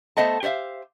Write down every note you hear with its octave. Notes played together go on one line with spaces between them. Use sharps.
A3 B3 C5 D#5 F#5 A5
G4 C5 C#5 E5 F5